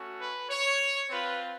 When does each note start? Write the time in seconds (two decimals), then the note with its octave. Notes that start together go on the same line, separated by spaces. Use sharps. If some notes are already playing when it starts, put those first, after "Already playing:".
Already playing: A3 C#4 F#4
0.19 B4
0.50 C#5
1.10 C4 F4 B4